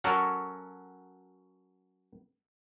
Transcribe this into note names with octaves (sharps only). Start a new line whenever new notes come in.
F#3 C#4 F#4 A4 A#4 C#5